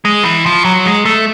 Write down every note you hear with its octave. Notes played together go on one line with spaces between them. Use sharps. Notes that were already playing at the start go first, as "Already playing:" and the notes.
G#3
E3
F3
F#3
G#3
A3